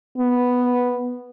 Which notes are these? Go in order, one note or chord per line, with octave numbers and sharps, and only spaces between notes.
B3